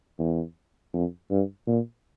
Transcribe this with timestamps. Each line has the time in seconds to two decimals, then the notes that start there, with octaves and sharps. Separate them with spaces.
0.19 E2
0.93 F2
1.30 G2
1.67 A#2